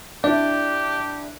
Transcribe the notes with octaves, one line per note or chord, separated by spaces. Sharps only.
D4 E4 G4 D5